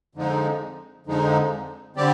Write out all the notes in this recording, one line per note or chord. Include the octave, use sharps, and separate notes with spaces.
F2 D3 F3 G#3 D#4
F2 D3 F3 G#3 D#4
D3 G3 C4 G4 D5